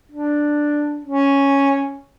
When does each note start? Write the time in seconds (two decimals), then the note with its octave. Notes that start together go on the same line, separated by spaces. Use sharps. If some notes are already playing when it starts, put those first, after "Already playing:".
0.12 D4
1.05 C#4